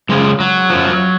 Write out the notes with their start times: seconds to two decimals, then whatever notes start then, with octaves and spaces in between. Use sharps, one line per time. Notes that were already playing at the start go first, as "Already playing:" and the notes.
0.09 F#2 C#3 F3 G#3
0.40 F#3
0.70 F#2 F3